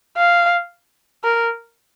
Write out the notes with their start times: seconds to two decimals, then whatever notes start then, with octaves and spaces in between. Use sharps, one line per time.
0.17 F5
1.24 A#4